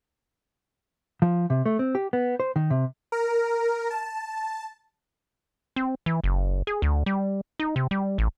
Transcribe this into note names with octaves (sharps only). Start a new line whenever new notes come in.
F3
C3
A3
C4
G4
B3
C5
D#3
C3
A#4
A5
C4
E3
F#1
G#4
D2
G3
D#4
C3
G3
A1